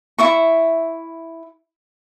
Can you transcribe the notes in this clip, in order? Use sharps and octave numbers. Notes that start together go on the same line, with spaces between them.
E4 E5 C#6